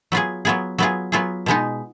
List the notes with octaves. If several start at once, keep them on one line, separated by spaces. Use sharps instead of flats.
F#3 B3 F4 G#4
F#3 B3 F4 G#4
F#3 B3 F4 G#4
F#3 B3 F4 G#4
B2 G#3 B3 D#4